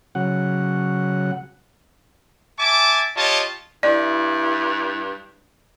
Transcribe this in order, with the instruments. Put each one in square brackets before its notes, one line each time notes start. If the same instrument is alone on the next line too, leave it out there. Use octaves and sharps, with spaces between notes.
[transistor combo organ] C#3 F#3 F#5
[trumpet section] E5 G#5 A5 D6
F4 G4 C#5 D#5 A5
[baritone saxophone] G2 [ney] E4 [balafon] D5